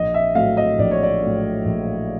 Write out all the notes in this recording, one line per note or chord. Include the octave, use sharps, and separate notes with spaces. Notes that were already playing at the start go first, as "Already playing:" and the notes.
Already playing: A#1 D#5
E5
A2 F#3 A3 F5
D#5
A#1 D5
C#5
D5
A2 F#3 A3
A#1